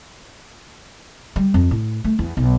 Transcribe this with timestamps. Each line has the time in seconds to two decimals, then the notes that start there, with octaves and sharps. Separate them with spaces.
1.36 G3
1.54 F2
1.71 A2
2.04 A3
2.19 E2
2.37 B1